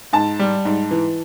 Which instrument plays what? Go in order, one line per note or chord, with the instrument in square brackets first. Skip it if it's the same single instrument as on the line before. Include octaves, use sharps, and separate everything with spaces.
[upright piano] G#2 A5
G3
G#2
E3